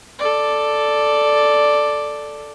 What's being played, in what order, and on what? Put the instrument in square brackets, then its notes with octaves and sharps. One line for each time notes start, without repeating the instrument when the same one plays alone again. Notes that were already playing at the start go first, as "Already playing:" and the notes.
[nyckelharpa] A4 D5